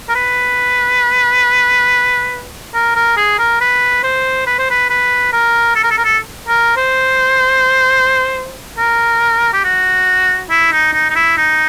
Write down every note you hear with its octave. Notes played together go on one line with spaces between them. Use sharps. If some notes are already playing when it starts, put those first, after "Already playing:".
A#4
B4
A#4
A#4
G#4
A#4
B4
C5
B4
C5
B4
B4
A#4
A4
A#4
A4
A#4
A4
A#4
C5
A#4
G4
F#4
E4
D#4
D#4
D#4
E4
D#4